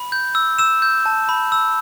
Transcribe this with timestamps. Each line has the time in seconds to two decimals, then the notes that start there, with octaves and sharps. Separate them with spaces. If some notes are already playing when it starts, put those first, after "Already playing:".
Already playing: B5
0.12 G6
0.35 E6
0.58 E6 E7
0.82 G6
1.06 A5
1.29 B5
1.52 E6